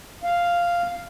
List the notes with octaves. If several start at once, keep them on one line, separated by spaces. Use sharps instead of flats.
F5